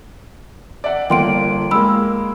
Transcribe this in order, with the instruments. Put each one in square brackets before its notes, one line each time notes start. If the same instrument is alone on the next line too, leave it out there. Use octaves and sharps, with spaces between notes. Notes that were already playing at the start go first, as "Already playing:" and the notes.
[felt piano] D5 E5 F#5
[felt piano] G1 F2 A#3 [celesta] G5 C6 D7
[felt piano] G#3 A#3 [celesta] B5 E6